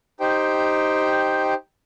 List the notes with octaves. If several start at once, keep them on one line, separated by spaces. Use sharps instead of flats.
D#4 G4 C5 G5